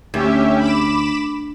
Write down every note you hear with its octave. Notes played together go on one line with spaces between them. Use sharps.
D2 C#4 G4 E5
B5 D6 E7